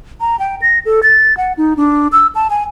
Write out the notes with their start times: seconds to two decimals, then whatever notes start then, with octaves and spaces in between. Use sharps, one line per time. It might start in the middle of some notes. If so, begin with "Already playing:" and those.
0.21 A#5
0.39 G5
0.62 A#6
0.85 A4
1.03 A6
1.37 F#5
1.57 D#4
1.77 D4
2.12 E6
2.35 A5
2.50 G#5